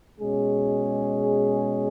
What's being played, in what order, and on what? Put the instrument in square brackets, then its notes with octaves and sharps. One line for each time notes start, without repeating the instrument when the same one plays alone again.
[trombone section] B2 G#3 C#4 G#4